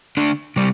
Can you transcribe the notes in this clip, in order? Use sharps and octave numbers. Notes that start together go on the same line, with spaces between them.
D3 A3 D4
C3 G3